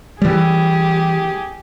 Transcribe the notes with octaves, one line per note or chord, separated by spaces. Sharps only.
E3 G3 G4 G#4